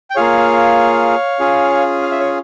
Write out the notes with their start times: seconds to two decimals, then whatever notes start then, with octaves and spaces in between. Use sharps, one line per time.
0.10 G5
0.15 A#3 F4 G#4 C#5 F5
1.40 C#4 F4 G#4
2.02 F5
2.11 E5
2.20 C#5